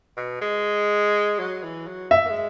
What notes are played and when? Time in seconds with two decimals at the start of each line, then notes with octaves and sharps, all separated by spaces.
0.17 B2
0.41 G#3
1.39 F#3
1.63 E3
1.87 F#3
2.11 E5
2.25 A#3
2.29 G#3